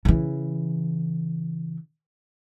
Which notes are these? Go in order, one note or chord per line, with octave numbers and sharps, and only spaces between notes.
C#3 E3